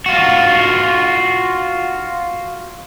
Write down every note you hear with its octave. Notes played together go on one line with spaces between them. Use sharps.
F4 F#4